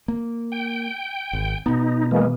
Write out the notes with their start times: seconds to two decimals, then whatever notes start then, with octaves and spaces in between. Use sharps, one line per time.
0.08 A#3
0.52 G5
1.33 G#1
1.66 B2 B3 D#4
2.11 E3 G#3 A#3